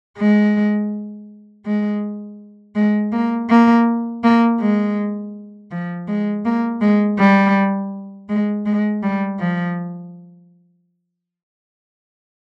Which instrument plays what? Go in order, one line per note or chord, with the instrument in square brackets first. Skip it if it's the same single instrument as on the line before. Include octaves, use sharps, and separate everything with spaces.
[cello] G#3
G#3
G#3
A#3
A#3
A#3
G#3
F3
G#3
A#3
G#3
G3
G#3
G#3
G3
F3